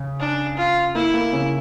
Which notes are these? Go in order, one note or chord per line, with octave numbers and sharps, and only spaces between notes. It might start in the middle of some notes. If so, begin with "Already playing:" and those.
Already playing: C#3
D4
F4
A#3 E4
A#3
C#3 C#4